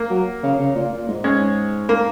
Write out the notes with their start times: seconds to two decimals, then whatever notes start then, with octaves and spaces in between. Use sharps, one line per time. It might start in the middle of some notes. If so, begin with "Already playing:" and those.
Already playing: A#3
0.10 F#3
0.43 C#3
0.59 C#3
0.75 A#2
0.92 A#2
1.08 G#2
1.24 G#3 C#4
1.89 A#3